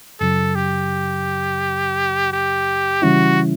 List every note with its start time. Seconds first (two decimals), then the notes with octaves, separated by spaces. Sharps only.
0.20 F#2 C#3 F#3 A4
0.55 G4
2.32 G4
3.02 C#3 E3 G3 C#4 E4 F#4